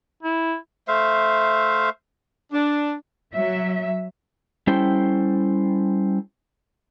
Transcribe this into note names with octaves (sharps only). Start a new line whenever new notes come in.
E4
A3 C5 E5 F5
D4
F#3 E5
G3 C#4 E4 A4 C5 G5